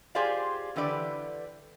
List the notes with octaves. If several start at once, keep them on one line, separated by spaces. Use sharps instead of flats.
F4 G4 G#4 C5 D5 F5
D3 E3 G4 B4 D5